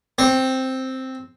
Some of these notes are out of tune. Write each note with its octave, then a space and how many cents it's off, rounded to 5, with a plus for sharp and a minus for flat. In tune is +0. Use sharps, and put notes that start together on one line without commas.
C4 +0 C5 +45